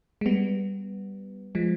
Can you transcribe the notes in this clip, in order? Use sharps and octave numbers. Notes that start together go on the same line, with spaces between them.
G#3
G3 B3
F3 G#3